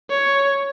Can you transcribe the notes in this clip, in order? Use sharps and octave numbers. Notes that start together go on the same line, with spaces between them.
C#5